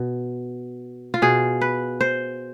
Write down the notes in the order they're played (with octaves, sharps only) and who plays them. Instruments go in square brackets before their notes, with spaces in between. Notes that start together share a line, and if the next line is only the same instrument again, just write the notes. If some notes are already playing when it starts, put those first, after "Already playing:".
Already playing: [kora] B2
F4
B2 G#4
B4
C5